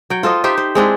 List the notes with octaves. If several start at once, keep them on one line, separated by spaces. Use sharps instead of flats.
F#3 G5
F4 A4 C5 D#5
D#4 G4 C5 E5
C5
G#3 C4 D4 E4